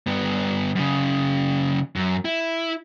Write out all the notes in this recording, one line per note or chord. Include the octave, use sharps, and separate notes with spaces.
G2 B3
F#2 C#3
F#2
E4